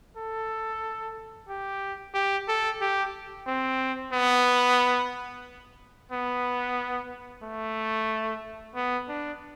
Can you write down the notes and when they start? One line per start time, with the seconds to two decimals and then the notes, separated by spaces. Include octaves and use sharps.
0.17 A4
1.49 G4
2.14 G4
2.48 A4
2.81 G4
3.47 C4
4.13 B3
6.12 B3
7.43 A3
8.76 B3
9.09 D4